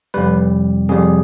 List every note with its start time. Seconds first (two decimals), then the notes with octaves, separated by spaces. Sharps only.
0.14 F2 C3 G3 B4
0.89 F2 C3 G3 G#4